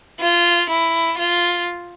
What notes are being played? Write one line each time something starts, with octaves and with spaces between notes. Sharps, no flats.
F4
E4
F4